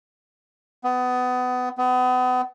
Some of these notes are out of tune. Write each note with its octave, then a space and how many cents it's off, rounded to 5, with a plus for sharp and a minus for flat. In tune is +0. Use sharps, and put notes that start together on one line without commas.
B3 +25
B3 +35